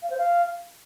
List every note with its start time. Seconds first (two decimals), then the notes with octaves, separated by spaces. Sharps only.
0.02 F5
0.10 C5
0.17 F5